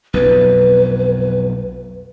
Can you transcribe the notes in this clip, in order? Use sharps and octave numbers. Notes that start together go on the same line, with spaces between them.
B1 F2 B4